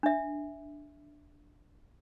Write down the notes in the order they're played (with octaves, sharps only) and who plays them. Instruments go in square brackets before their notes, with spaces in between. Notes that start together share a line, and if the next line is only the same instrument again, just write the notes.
[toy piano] D4 E5